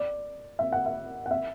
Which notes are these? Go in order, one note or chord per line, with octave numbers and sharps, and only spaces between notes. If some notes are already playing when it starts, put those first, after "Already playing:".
Already playing: D5
E5
F#5
E5
F#5
E5